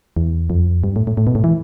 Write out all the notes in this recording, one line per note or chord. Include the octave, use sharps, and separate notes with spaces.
E2
F2
G2
A2
A2
A2
B2
A2
E3